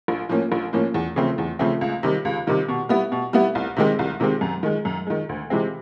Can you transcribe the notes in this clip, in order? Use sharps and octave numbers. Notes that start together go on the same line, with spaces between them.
A#1
A2 F3 A#3 C#4
A#1
A2 F3 A#3 C#4
E2
C#3 F3 A3 C4
E2
C#3 F3 A3 C4
C#2
C3 D#3 G3
C#2
C3 D#3 G3
B2
G3 B3 E4
B2
G3 B3 E4
C2
C3 D#3 G#3 C4
C2
C3 D#3 G#3 C4
F#2
D#3 G#3
F#2
D#3 G#3
D2
C3 E3 G#3 C4